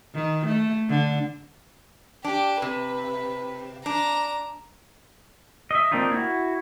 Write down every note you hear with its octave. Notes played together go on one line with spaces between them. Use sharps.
D#3
A3
D3
D4 G4
C3 B4
D4 A#5
D#5 E5
A#3 C4 D4 D#4 F4
E4 F#4